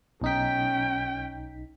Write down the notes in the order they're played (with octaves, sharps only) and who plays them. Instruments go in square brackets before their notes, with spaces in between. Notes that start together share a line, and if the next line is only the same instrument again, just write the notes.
[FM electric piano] B1 D#4 B6 [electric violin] C#4 G5